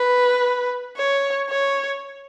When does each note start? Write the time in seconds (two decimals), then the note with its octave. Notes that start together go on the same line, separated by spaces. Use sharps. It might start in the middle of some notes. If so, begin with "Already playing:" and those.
Already playing: B4
0.97 C#5
1.50 C#5